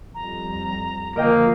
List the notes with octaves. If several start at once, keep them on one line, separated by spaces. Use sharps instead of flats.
F2 G3 A#5
D3 F3 A#3 A#4 D#5 G5